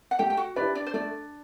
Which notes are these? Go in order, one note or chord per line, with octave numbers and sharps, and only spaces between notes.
F#5
A3 G4 G5
G5
F#4 F#5
D4 E4 G4 B4 D5
D4 D5
C5
A3 D4 D5